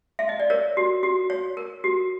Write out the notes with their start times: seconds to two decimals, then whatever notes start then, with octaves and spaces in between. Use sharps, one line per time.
0.19 E5
0.29 D#5
0.40 D5
0.50 A#4 C#5
0.77 F#4
1.03 F#4
1.30 C#5
1.57 A#4
1.84 F#4